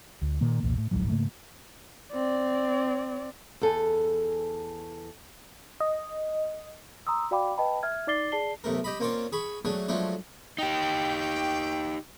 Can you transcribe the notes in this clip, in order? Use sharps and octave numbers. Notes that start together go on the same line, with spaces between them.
D2
A#2 D#3 A#3
B1 E2 A#2
A2
D1 A#1 G#2 F#3
G#2 C#3 A3 A#3
C4 D5
E2 A4 G#5
D#5
A#5 C6 D#6 E6
F#4 D5 F5 G5 B5 D6
B4 D#5 G5 A5 B5
E5 F6 G#6
D#4 D5 D6 A6 C7 G7
G#4 D5 A5 C7 G7
B1 C3 A3 A#4
G4 D#5 B5
A#3 C4 C#4 F4 C#5 D5
G#4 B5 C#6
F#3 A3 D4 G#4
F3 F#3 G#3 A3 D4 A4
D#4 G4 G5